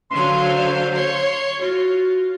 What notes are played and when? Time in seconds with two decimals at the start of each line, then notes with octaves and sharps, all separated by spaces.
0.11 D3 F#3 F5 C6
0.44 C5
0.93 C#5 C6
1.60 F4 F#4